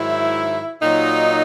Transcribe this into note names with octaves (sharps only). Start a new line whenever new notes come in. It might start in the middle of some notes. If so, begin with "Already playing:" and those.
Already playing: G#2 D#3 F#3 E4
A#2 F#3 D#4